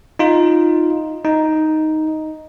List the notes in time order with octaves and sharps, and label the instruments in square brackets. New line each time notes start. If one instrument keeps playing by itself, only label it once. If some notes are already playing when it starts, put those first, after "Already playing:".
[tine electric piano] D#4 F4
D#4